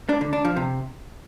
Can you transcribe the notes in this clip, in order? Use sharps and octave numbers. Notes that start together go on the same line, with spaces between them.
D4
D3
D4
F3
C3